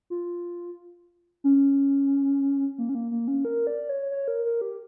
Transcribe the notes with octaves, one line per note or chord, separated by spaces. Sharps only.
F4
C#4
A#3
C#4
A#3
A#3
C#4
A#4
D5
C#5
C#5
A#4
A#4
G4